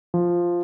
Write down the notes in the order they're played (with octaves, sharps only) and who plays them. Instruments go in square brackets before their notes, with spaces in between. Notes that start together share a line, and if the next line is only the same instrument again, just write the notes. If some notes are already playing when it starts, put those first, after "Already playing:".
[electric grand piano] F3